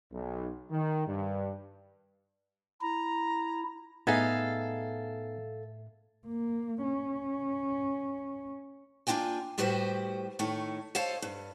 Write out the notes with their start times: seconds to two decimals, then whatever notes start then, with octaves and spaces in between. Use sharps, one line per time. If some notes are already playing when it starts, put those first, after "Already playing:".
0.12 B1
0.71 D#3
1.07 G2
2.81 E4 A#5
4.07 A2 B3 D#4 G#4 A4 E5 F5 G#6
6.26 A#3
6.83 C#4
9.07 A#3 D4 F4 G5 G#5
9.58 A2 G3 F#4 G4 B4 C5
10.39 A2 D#3 A3 C#5
10.95 A4 C5 C#5 D#5 F5 A5
11.22 G2